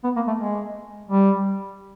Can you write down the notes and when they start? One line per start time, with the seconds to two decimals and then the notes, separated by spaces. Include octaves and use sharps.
0.04 B3
0.16 A#3
0.27 A3
0.39 G#3
1.10 G3